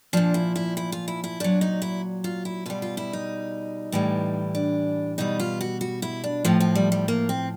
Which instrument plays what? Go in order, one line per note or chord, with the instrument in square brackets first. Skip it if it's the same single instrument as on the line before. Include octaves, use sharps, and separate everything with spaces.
[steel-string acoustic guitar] A#2 F3 D4
E4
E4
E4
F4
E4
E4
A#2 F#3 D4
D#4
E4
F4
E4
B2 G3 F4
F4
E4
D#4
A2 E3 G3
D4
B2 G3 D#4
F4
F#4
F#4
E4
D4
A2 F3 C4
C4
G3
G3
A#3
C4